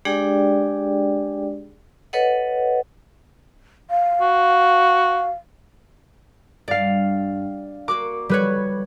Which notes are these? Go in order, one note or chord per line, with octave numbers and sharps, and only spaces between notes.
G#3 D4 G4 G#4 D5 G5
A4 B4 C#5 D#5 F#5
F5
F#4
G2 D5 F5
A#3 F#4 A#4 D6
G3 F#4 A#4 B4 C#5 D5